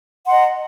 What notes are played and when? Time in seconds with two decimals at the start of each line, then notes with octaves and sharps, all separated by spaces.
0.24 F#5
0.27 C6
0.29 A#5
0.32 D#5